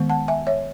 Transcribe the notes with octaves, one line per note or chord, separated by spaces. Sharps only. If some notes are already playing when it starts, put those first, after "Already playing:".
Already playing: D#3 G#3 B3
F#5 A5
E5 G#5
C#5 E5